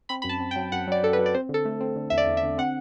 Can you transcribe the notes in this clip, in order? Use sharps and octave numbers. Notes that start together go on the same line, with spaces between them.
C4 B5
F#2 B5
A5
C4
G5
F#3
F#2 F#5
F#3 D5
F#2 A4
B4
F#3
D5
C4 C5
D3
A4
A3
C4
D3
E2 E5
D5
E2
E5
D3
C4 F#5